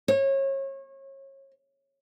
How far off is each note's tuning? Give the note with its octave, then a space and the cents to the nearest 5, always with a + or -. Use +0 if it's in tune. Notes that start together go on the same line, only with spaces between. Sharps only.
C#5 -30